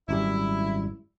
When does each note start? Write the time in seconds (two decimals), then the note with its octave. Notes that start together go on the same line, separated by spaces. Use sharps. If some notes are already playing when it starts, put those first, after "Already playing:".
0.09 G#1 F#2 G3 E4